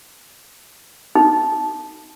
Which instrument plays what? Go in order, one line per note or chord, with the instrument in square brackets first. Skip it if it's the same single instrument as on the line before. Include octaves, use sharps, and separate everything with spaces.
[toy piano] D#4